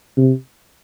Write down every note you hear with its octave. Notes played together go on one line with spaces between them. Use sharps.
C3